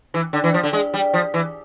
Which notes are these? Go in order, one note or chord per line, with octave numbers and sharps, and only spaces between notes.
E3
D3
E3
F3
D3
G#3
G3
F3
E3